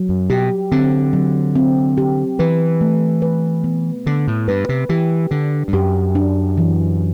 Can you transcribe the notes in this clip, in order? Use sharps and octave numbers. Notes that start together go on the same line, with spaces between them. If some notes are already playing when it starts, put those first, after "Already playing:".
Already playing: F#3
F#2
B2 G4
D3 C4
F#3
C4
G4
E3 B4
A3
B4
B3
D3 B3
A2
G2 B4
C3
E3 G4
D3 D4
G2
F#2 G4
D4
E3